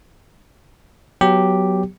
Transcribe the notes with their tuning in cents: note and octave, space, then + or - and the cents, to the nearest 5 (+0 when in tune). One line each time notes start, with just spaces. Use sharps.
F#3 +10 B3 +0 G4 +0